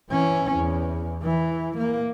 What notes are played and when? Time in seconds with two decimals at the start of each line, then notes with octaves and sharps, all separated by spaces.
0.10 E3 C#4
0.56 E2
1.22 E3
1.78 A#3